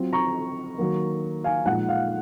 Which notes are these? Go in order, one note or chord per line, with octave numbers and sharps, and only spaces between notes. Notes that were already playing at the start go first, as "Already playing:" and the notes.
Already playing: F#3 C4 F4
A#5 C#6
D#3 F#3 A#3
F5 G#5
A#2 F3 G#3 D#4 F#5
F5